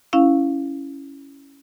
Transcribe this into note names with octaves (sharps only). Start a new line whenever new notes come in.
C#4 E4 F5